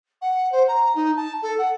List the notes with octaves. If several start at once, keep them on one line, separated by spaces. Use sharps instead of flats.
F#5
C5
A#5
D#4
A5
A4
F#5